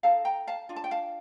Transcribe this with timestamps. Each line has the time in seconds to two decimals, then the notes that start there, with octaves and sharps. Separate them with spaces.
0.03 D#4 A4 F5 A5
0.25 G5 A#5
0.47 F5 A5
0.69 D4 F4
0.76 A5
0.84 G5
0.91 F5 A5